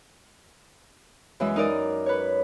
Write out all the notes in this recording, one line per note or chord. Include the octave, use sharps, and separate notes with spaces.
F#2 E3 G#3 E5
D#4 A#4 D5 D#5
B4 C#5